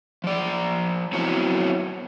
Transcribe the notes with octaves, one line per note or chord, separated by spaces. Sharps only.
F3 D5
F#3 B3 C4 E4 C#5